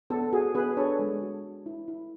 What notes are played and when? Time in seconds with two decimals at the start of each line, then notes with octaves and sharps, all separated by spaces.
0.10 B3 A4
0.33 F#4 G#4
0.55 B3 G#4 B4
0.77 D4 A4 C#5
0.99 G#3
1.21 F#4
1.43 G#3
1.66 E4
1.88 E4